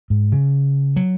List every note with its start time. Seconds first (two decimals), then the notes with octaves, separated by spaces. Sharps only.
0.10 G#2
0.32 C#3
0.96 F#3